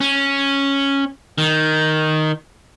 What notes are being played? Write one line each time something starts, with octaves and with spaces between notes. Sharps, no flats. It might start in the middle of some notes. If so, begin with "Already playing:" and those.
C#4
D#3